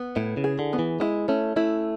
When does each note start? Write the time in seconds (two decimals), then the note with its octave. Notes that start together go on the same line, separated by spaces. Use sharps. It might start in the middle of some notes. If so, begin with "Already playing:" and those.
Already playing: B3
0.16 A2 E4
0.37 C#3
0.44 G#4
0.59 D3
0.73 B3
0.79 E3
1.00 G#3 E4
1.28 A3 C#4
1.56 A3 E4